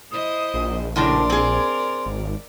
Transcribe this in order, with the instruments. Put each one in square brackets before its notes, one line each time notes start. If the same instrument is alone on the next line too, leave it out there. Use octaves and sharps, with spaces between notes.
[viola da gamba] E4 C5 D#5 [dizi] D#6
[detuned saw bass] A#1
[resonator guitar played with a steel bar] A2 C#3 D4 [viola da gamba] A#4 D5 [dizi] C6
[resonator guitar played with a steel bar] C4 G#4
[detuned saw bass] G#1